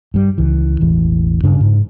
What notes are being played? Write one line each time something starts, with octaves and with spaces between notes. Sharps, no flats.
G2 G3
C#2 E3
E1 A1 E3
G2 C#3 D4
G#2